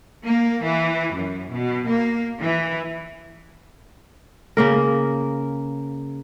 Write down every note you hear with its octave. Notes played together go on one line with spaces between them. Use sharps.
A#3
E3
F#2
B2
A#3
E3
C#3 A#3 A#4